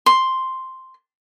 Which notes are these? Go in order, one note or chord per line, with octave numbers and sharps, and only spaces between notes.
C6